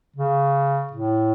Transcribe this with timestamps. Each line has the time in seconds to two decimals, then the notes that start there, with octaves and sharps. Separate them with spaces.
0.16 C#3
0.93 A2